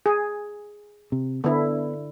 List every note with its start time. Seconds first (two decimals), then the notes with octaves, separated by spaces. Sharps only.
0.06 G#4
1.12 C3
1.44 D3 B3 E4